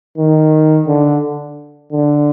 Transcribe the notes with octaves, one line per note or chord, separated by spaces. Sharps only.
D#3
D3
D3